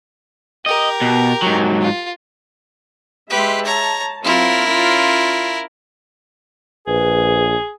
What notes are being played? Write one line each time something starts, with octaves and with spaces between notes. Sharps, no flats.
G4 A#4 D#5
B2
G#2 F#3
F4
G#3 G4 B4 E5 C6
C#5 A5 A#5
F#3 C4 E4 F4 A#4
C#4 F4
A#1 G#4 B4